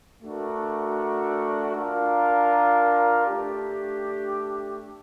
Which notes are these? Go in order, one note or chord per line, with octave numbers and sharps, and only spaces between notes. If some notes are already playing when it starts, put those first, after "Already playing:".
A3 D4 F#4 A#4
D4 F4 A#4
A3 D4 G4